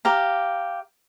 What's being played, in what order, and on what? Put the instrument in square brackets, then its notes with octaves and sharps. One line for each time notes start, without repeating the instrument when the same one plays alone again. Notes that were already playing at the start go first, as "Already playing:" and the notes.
[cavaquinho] G4 F5 A#5